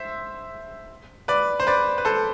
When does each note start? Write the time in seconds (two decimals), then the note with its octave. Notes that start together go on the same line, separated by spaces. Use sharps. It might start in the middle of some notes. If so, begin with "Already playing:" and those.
Already playing: C5 E5
1.28 B4 D5
1.60 C5
1.67 B4 D5
1.98 B4
2.05 A4 C5